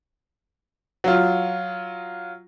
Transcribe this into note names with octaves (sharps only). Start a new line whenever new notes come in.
F#3 F4